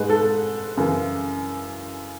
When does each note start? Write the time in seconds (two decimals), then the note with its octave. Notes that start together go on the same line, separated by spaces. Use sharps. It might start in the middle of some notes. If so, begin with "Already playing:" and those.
Already playing: G#2 G#3 B4
0.10 A4
0.77 F#2 C#3 E3